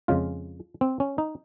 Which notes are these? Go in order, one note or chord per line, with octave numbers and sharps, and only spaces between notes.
F2 C#3 G#3 F4
C4
C#4
D#4